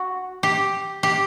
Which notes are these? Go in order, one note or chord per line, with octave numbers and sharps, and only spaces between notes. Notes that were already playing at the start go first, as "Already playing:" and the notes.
Already playing: F#4
G4
G4